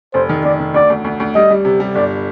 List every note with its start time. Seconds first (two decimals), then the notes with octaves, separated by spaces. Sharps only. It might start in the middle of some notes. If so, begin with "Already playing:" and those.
0.14 F1 C5
0.29 D#3
0.44 F1 D5
0.59 F1
0.74 D2 D5
0.90 D2
1.04 D2
1.20 D2
1.35 G3 D#5
1.50 G3
1.65 C3
1.80 G3
1.95 G1 D5